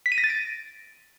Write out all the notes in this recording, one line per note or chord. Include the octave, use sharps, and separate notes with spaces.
B6
D#7
A#6
A6
D7